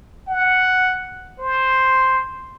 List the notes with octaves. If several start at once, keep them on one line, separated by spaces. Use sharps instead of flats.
F#5
C5